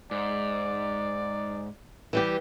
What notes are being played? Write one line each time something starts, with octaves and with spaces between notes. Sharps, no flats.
G#2 D5
E3 G3 G4